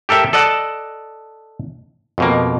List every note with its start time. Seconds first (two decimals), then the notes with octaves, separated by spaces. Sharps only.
0.09 G4 A4 A#4 E5 G5
0.33 A4 D5 D#5 F#5 A5
2.18 F2 B2 A#3